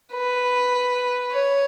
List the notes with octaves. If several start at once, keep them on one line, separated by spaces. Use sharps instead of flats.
B4
C#5